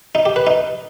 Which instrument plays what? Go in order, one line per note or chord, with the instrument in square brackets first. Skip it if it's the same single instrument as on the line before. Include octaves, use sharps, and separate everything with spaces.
[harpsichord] D#4
G4
B4
D#4